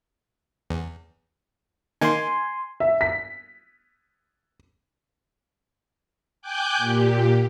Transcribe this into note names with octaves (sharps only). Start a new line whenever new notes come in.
E2
D#3 A#3 D#4 G#5 C6
E5
B6
G5 G#5 D6 F#6 G6
A#2 G4